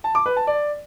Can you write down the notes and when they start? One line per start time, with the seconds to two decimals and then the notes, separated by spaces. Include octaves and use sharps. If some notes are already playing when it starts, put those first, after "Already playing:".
0.04 A5
0.15 D6
0.26 B4
0.36 A5
0.47 D5